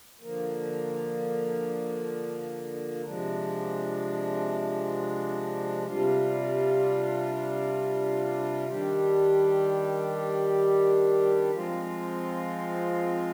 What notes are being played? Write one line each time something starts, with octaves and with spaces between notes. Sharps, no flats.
D3 F3 A#3
C3 F3 G#3 D4
C3 G3 D4 F4
D#3 G3 D4 G4
F3 G#3 C4 F4